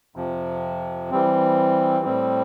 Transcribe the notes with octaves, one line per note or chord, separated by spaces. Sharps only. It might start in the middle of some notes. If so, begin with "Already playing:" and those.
F2 C3 F3
E3 G3 C4
A2 G3 C4